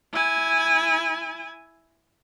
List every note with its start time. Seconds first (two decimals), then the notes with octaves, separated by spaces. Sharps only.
0.13 E4 G#5